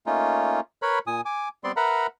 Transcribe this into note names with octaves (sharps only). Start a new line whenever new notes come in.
A3 A#3 C#4 D#4 F4
A#4 B4 C#5 B5
A#2 G#5 D#6
G#5 D6
G3 B3 C4 D5 C6
A#4 B4 E5 F#5 A#5 B5